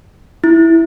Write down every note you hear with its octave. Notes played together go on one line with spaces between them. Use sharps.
E4